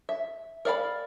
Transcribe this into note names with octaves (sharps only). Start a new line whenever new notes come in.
E5
A#4 D5 F5 F#5 B5